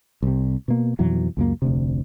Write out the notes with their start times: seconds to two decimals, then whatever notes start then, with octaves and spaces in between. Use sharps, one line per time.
0.22 C2 C3
0.68 B2 A#3
0.99 F2 B2 E3 F#3
1.37 C#2 F#2 A#3
1.62 F1 D2 C3